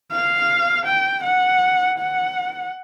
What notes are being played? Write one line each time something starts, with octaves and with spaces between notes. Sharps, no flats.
F5
G5
F#5
F#5